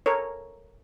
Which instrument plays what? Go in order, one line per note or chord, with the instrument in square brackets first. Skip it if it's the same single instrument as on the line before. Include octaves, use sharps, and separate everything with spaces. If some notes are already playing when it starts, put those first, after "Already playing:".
[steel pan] A4 A#4 C#5